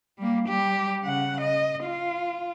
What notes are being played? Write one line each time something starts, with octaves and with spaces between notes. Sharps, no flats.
G3 A#3
G3 G4
C#3 F#5
D#5
F4